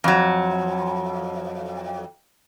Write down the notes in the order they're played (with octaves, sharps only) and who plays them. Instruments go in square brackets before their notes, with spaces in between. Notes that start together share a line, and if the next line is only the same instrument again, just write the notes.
[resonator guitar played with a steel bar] F2 F#3